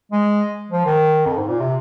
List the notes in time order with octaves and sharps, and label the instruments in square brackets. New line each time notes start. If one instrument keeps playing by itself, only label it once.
[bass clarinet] G#3
F3
D#3
F2
G#2
A#2
C3